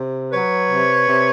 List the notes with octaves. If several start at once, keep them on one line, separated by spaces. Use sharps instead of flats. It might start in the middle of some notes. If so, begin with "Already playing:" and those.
Already playing: C3
F#3 B4 C#5
C3
C3